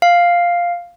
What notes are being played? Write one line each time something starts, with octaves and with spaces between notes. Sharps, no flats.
F5